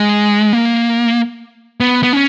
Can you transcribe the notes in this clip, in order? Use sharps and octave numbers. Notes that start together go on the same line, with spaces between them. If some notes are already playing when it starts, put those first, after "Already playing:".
Already playing: G#3
A#3
B3
B3
C#4